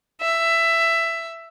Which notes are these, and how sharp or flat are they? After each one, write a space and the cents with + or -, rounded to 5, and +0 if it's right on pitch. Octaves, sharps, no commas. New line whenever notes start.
E5 +15